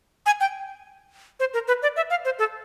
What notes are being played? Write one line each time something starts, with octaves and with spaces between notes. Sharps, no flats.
G#5
G5
C5
A#4
B4
D5
E5
F5
C5
A4